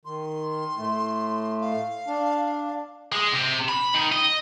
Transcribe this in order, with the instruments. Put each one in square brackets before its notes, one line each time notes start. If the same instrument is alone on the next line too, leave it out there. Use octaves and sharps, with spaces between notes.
[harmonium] D#3 [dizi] C6
[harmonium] A2 A3
[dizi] F5
[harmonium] D4
[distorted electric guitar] G#3
C3
B5
D#3
D#5